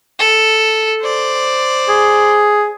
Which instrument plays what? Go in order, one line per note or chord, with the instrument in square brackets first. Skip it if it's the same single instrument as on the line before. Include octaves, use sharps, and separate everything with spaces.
[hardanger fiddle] A4
C5 D5
[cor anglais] G#4